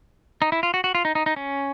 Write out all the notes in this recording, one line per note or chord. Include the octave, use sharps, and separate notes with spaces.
D#4
E4
F4
F#4
F#4
F4
D#4
D#4
D#4
C#4